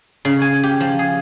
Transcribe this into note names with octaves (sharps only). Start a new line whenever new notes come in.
C#3
G#5
G4
F3
G#4